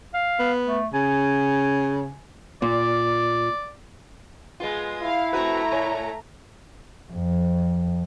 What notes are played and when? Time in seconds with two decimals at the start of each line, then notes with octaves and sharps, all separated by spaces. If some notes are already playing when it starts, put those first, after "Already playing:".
0.14 F5
0.39 B3
0.67 A3
0.93 C#3 G#5
2.62 A#2 D5
4.60 G#3 B3 F4
5.03 E4 F5
5.33 A3 C4 F#4 B4 A#5
5.72 A2 C#5
7.12 F2